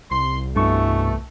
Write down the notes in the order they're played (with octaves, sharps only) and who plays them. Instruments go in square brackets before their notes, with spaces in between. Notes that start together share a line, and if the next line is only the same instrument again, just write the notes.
[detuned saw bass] C2 [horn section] C6
[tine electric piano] G2 C#6 [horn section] B2 E3 A3